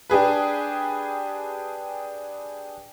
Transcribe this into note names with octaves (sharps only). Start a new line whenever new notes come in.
D4 G4 G#4 B4